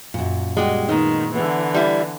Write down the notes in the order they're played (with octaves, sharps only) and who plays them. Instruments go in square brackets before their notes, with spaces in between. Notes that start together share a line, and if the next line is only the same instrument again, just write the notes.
[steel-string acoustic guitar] F#2 A#2
[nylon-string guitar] G3 F#4 G4 [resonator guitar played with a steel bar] G#3
[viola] D#3 [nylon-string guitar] B3 D#4
[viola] D3 E3 [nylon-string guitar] B3
[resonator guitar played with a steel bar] G3 E4